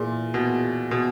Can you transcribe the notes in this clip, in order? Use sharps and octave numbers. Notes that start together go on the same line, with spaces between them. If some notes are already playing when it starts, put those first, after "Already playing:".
Already playing: A#2 E3 A#3 E4 G#4
B2
B2